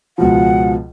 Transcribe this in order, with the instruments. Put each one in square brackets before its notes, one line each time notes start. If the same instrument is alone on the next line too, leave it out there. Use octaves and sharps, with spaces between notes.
[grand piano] C#2 B2 F3 [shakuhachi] F#5